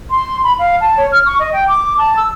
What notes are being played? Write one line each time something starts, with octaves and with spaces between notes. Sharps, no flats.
C6
B5
F5
A5
C#5
F6
C#6
D#5
G5
D6
A5
E6